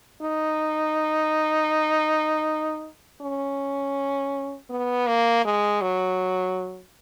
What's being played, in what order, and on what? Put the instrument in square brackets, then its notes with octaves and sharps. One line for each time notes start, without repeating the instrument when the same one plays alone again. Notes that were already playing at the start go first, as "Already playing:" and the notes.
[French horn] D#4
C#4
B3
A#3
G#3
F#3